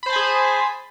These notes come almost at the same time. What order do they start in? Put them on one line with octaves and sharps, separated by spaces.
B5 C5 A5 G#5 G#4